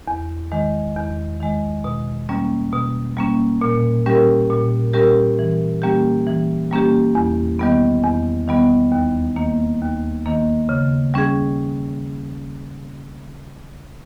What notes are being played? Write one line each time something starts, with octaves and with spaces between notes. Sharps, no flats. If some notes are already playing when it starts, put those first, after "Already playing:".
E2
D#3 G#3
E2
D#3 G#3
B2
G3 A#3 C#4
B2
G3 A#3 C#4
A#2
G3 C#4 G4 A#4
A#2
G3 C#4 G4 A#4
E3
G3 A#3 C#4 G4
E3
G3 A#3 C#4 G4
E2
D#3 G3 B3
E2
D#3 G3 B3
D#2
D#3 A#3
D#2
D#3 A#3
C#3
G3 C#4 G#4